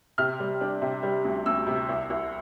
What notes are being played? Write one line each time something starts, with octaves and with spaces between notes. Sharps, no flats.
C3 F6
G3
D4
C3
G3
D2
D2 E6
C3
C2
C2